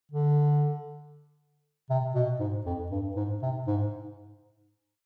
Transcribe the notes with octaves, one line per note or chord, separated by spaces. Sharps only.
D3
C3
B2
G#2
F2
G2
G#2
C3
G#2